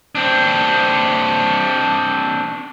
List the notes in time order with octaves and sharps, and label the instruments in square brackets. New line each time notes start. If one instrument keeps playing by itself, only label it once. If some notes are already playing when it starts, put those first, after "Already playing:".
[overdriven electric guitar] C4 D4